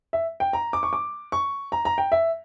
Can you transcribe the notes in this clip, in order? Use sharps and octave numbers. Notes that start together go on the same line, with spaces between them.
E5
G5
A#5
D6
C#6
D6
C#6
A#5
A#5
G5
E5